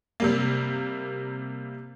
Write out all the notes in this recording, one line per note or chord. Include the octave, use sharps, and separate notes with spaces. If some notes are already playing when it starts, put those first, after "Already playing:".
C3 G3 A#3